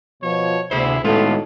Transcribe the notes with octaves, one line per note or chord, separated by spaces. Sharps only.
B2 F3 C#5
D2 C3 E4 G#4 C5
A2 G#3 B3 C4 D#4 F4 F#4 A4